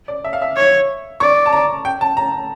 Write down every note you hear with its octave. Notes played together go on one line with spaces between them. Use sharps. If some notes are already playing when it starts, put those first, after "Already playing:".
D5
E5
F5
E5
C#5
D5 C#6
A5
A#5
G5
A5
A#5